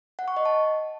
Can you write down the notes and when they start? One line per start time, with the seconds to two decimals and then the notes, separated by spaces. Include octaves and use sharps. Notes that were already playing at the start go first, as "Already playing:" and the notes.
0.19 F#5
0.28 C#6
0.37 D#5
0.45 A5